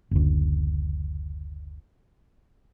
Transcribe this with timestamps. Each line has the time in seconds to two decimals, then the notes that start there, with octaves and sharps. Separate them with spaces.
0.11 F#1 D2